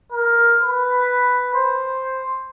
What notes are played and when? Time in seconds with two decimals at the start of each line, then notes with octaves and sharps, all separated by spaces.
0.12 A#4
0.63 B4
1.54 C5